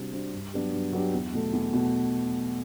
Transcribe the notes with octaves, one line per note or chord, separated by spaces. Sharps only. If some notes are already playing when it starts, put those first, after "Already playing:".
Already playing: C3 G3 D4 F#4 C5
G3 D4 F#4 C5
G2
F#3 B3 D4 G4
G2
F#3 B3 D4 G4
E2
B2 A3
E2
B2 A3